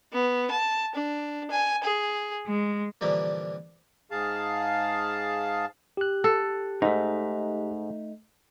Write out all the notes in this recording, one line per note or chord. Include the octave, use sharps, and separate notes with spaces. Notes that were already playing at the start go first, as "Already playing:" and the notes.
B3
A5
D4
G#5
G#4
G#3
A#2 D3 E3 F3 G3 A#3
G#2 G#4 F5 A5
G4 F#6
A4
G#2 A3 D#4